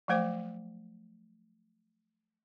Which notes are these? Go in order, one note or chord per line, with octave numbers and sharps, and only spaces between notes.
F3 F#3 A3 C5 G5 D6